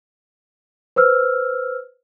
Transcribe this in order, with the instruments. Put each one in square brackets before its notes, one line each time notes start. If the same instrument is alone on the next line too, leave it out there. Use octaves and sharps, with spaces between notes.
[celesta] B4 C5 E6 F6